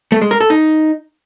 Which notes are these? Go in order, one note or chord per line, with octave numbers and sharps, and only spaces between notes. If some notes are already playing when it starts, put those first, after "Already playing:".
A3
G#3
A#4
A4
D#4